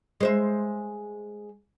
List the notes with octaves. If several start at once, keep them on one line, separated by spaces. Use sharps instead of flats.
G#3 C5 E5